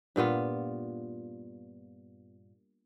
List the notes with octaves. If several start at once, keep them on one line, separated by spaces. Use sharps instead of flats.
G2 A#2 B3 F4